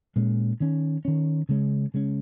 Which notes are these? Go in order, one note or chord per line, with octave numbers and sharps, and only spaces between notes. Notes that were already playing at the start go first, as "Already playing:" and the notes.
A#2 G#3 C#4
D#3 C#4
D#3 C#4
C#3 G#3 C#4
C#3 G#3 C#4